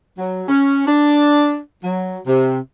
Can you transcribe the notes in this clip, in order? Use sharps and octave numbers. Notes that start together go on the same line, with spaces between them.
F#3
C#4
D4
F#3
C3